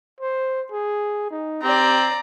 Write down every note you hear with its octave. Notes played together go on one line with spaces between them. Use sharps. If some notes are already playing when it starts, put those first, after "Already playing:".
C5
G#4
D#4
C4 G4 D5 A#5